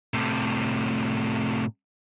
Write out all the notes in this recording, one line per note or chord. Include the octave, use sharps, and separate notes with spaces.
A2 C3